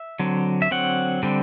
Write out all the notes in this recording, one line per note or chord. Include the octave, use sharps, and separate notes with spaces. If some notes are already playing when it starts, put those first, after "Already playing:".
Already playing: E5
D3 F#3 C4
E5
D3 F#3 C4 F#5
D3 G3 C4